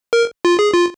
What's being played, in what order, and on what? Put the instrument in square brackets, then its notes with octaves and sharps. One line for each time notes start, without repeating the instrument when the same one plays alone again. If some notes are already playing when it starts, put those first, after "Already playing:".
[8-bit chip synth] A#4
F4
G#4
F4